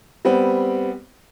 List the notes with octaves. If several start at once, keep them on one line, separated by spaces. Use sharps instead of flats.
G3 B3 C4